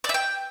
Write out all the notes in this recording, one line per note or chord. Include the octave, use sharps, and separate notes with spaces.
D5
E5
G5